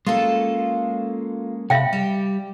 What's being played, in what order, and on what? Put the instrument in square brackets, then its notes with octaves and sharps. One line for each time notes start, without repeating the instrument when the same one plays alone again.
[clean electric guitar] G#3 A#3 C#4 [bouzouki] F4 A4
[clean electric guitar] C3 B5 [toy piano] E5 F5 G5
[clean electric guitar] G3 [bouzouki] G4